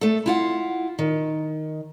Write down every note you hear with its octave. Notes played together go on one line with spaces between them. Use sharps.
A3 A4
E4 F4 F#5
D#3